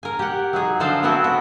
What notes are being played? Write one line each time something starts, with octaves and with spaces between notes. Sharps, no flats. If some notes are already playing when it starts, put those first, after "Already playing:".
A#4 G#5
G4 F#5
F#3 D#4 G#4
D3 F3 A4 C5 F5 A#5
F#3 B3 C4 E4 F#4 D#5
F#4